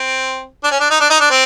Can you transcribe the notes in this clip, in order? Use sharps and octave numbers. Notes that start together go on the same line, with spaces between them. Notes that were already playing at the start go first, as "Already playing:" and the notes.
Already playing: C4
D4
C#4
D4
D#4
D4
D#4
D4
C4